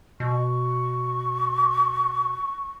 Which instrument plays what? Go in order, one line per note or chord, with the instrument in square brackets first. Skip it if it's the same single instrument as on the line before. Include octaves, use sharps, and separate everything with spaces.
[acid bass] B2 [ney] C#6